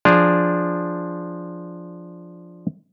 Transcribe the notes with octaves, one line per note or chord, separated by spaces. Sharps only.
F3 D4 G#4 A#5